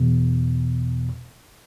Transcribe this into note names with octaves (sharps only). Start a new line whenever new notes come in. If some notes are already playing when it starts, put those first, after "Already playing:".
Already playing: E2 B2